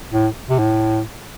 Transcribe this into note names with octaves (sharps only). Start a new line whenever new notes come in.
A2
C3
A2